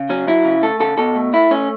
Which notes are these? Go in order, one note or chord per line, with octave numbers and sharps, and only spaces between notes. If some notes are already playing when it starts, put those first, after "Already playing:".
Already playing: C#3
F#3 C#4
F#3 E4
C#3
A3 A4
C#3 A4
B2 A4
A3
A3 E4
A3 C#4